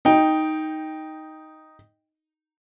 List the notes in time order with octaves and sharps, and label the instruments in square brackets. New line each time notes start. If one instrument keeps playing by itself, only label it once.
[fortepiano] D#4 G5